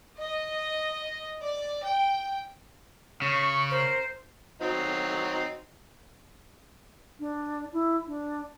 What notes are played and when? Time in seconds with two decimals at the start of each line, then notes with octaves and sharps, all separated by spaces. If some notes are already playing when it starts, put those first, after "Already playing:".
0.19 D#5
1.41 D5
1.84 G5
3.22 C#3 C#6
3.71 A#4 C5
4.61 F#3 C4 D#4
7.20 D4
7.73 E4
8.07 D4